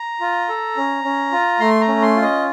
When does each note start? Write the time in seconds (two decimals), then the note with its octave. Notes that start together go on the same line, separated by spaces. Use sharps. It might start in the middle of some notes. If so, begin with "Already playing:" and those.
Already playing: A#5
0.21 F4
0.49 A4
0.77 C#4
1.04 C#4
1.32 F4
1.60 A3 C6
1.81 A#5
1.88 C#4
2.02 C6
2.16 F4
2.22 D#5